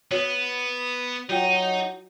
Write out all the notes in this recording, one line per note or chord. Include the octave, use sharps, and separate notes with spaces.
B3 F#4 C#5
F#3 D#4 F4 G5